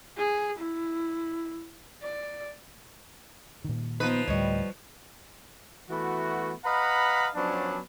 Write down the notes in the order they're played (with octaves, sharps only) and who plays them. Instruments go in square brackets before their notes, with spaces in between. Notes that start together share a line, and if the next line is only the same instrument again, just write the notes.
[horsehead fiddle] G#4
E4
D5
[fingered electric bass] A#2 D#3
[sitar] F3 B4 [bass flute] B3 [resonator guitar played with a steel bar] D#4
[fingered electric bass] D2 A2 [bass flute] G3 [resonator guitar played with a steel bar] C#5 D#5
[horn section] E3 A3 B3 F#4
B4 D#5 F5 F#5 A#5 B5
F3 F#3 B3 C#4 D4